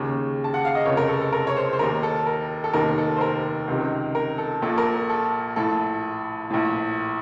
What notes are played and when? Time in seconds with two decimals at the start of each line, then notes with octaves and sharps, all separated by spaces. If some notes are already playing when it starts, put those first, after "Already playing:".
Already playing: D#2 C#3
0.44 A5
0.54 F#5
0.65 F5
0.75 D#5
0.85 F1 F2 C#3 C#5
0.97 A#4
1.09 A4
1.21 A4
1.32 A#4
1.47 C#5
1.56 C5
1.73 C5
1.79 D#2 D#3 A#4
2.03 A4
2.26 A#4
2.64 A4
2.73 F1 D#2 D#3 A#4
2.98 A4
3.17 C5
3.21 A#4
3.68 C#2 C3 D#3
4.15 A#4
4.38 A4
4.62 A#1 A#2 A4
4.78 A#4
4.94 A4
5.10 A4
5.56 A#1 A2 A4
6.50 A#1 A2